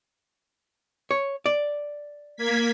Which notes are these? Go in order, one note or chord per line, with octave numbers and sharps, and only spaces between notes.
C#5
D5
A#3 G#6 B6